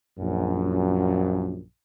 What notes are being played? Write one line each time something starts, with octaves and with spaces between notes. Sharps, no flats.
A#1 F#2